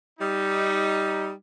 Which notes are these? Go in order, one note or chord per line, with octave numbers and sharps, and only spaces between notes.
G3 D#4